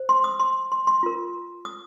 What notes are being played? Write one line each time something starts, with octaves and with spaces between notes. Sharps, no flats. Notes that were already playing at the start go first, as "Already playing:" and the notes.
Already playing: C5
C6
D#6
C6
C6
C6
F4 A#4
D#6